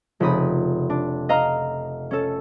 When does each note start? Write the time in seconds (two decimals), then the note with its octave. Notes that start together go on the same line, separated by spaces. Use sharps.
0.20 F1 C#3 D#4 B5 D#6
0.90 D4
1.29 D#5 F5 A#5 F6
2.11 C#4 A4